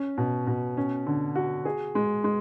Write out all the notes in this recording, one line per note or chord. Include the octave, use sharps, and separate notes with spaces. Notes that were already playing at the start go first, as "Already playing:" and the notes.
Already playing: C#4
B2
B2
C#4
D3
F#4
G#4
G#3
G#3